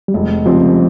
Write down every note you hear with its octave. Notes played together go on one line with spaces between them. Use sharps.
G3
F1 G#3
F2 C#3 F3 G3 C4